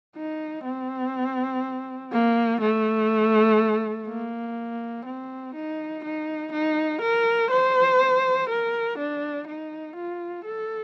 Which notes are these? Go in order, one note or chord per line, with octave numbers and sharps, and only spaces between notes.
D#4
C4
A#3
A3
A#3
C4
D#4
D#4
D#4
A#4
C5
A#4
D4
D#4
F4
A4